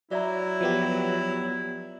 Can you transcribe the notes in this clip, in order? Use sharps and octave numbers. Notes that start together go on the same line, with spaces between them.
F#3 E4 D5 E5 A#5
F3 B3 G4